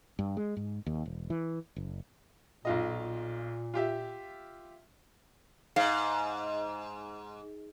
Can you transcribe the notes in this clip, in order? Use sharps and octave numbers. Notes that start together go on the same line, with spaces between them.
G2
G#3
G#2
D#2
E1
E3
F#1
B1 A#2 F4 D#5
F4 G4 E5
G#2 F5